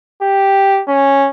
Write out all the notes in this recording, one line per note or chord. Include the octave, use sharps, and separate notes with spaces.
G4
C#4